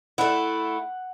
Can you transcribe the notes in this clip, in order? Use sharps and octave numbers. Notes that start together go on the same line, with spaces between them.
A3 E4 F#5